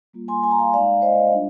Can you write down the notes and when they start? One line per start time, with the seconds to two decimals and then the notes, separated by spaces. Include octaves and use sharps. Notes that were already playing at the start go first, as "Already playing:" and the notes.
0.13 G3 A#3 F4
0.28 G#5 C6
0.43 G#5
0.51 A#5
0.59 F5 G#5
0.74 G#3 D#4 D5 F5
1.02 C5 D#5
1.32 G3 D4 F4